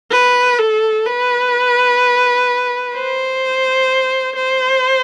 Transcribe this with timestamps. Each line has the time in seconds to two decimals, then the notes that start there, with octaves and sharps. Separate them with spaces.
0.11 B4
0.59 A4
1.06 B4
2.94 C5
4.36 C5